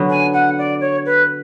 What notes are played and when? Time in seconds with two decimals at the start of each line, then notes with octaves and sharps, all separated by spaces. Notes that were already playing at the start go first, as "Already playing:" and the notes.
Already playing: D3 F#3 B3
0.10 G#5
0.33 F#5
0.58 D5
0.81 C#5
1.06 B4